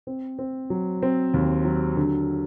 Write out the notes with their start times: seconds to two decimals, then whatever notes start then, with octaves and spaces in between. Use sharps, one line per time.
0.07 C4
0.39 C4
0.70 F#3
1.03 C4
1.34 D#2
1.64 F#3
1.96 D3